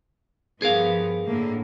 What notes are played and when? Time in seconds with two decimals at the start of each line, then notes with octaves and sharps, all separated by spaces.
0.62 G2 F3 B3 G#4 A#4 F5
1.26 A2 D3 A#3